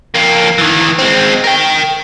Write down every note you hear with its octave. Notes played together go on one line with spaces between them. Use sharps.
F2 A#3
D#3 E3
G#3 C4
A#4 G5